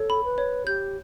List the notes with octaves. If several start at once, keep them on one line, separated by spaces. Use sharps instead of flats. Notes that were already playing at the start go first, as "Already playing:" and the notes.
Already playing: A4 C#5
B5
B4
C#5
G4 G6